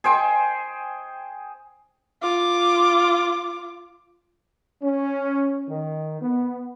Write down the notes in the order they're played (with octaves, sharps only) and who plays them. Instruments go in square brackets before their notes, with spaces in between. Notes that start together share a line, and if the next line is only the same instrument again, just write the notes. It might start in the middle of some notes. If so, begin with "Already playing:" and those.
[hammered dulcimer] G#4 C5 G5 C#6
[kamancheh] F4 D6
[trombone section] C#4
D#3
B3